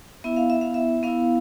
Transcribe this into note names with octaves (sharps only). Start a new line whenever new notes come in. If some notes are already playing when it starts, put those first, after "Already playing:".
B3 E4 E5
F5
E5
F5
E5
B3 E4 F5